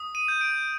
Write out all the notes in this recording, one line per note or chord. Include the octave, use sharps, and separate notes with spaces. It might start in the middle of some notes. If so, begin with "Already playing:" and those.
Already playing: D#6
D#7
G6
D7